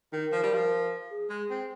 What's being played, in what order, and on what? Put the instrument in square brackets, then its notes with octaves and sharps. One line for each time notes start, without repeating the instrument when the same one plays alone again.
[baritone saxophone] D#3 [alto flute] A#4
[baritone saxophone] F3
G3
F3
[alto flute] G#4
[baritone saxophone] G#3
C4